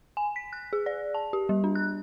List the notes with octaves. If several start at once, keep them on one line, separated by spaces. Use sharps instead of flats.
G#5
B6
F#6
G#4
D5
A5
G4
G3
D4
F#6